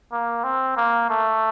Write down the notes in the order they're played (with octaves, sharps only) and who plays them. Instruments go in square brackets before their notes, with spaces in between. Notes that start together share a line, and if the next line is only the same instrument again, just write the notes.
[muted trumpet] A#3
C4
A#3
A3